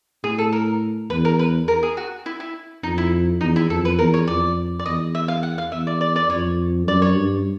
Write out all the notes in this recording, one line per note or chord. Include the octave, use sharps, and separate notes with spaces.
A2 G#4
A4
A#4
E2 B4
A#4
B4
A#4
G#4
F#4
E4
E4
F2 D#4
E4
E2 D#4
E4
F2 A4
B4
E2 A#4
C#5
F2 D5
D5
E2 D#5
E5
F5
F#5
F5
E2 E5
D5
D5
D5
F2 C#5
F#2 D5
C#5
G2